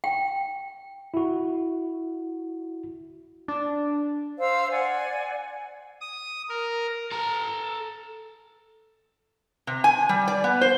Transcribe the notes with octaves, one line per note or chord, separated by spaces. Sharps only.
G5
E4 F#4
D4
C5 F5 E6
D5 F#5 G#5
D#6
A#4
A4 A#5
C3
G#5
G3
D5
B3
C5